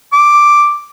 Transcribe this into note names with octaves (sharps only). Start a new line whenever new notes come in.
D6